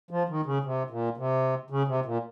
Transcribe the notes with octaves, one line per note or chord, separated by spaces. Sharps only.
F3
D#3
C#3
C3
A#2
C3
C#3
C3
A#2